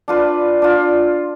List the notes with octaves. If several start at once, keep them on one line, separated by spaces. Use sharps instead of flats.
D4 F4 B4
D4 F4